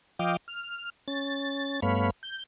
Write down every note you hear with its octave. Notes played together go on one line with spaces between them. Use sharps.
F3 D#5 F5 G5 D6
F6
C#4 A6
G2 A3 B3 C#5 F5 B5
G6